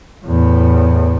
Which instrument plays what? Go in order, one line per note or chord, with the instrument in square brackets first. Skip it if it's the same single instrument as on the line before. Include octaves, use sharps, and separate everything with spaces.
[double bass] E2 A2